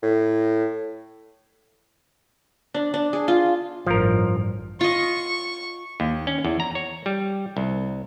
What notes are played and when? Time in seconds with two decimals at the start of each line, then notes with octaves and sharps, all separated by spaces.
0.03 A2
2.74 D4
2.94 D4
3.13 G#4
3.28 F4
3.87 A1 G2 F3 A#4
4.81 F4 D#5 C#6
6.00 D#2
6.27 C#4
6.45 E2
6.60 A#5
6.75 C#5
7.06 G3
7.57 C2